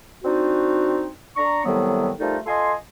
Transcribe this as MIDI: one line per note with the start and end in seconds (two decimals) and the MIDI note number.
0.24 1.07 60
0.24 1.07 62
0.24 1.07 63
0.24 1.07 66
1.36 1.61 62
1.36 1.61 82
1.36 1.61 85
1.65 2.10 45
1.65 2.10 48
1.65 2.10 51
1.65 2.10 54
1.65 2.10 55
1.65 2.10 59
2.19 2.38 53
2.19 2.38 55
2.19 2.38 57
2.19 2.38 63
2.19 2.38 69
2.19 2.38 70
2.46 2.72 65
2.46 2.72 69
2.46 2.72 75
2.46 2.72 80
2.46 2.72 84